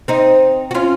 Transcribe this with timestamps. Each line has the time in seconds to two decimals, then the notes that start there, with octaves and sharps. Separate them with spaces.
0.08 C4 D#4
0.71 F#4
0.74 C#4 F4